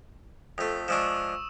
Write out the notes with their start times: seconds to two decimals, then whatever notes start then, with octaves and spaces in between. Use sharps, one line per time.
0.58 F2 A3 D#6
0.88 F3 G#3 D4 C#6 E6 E7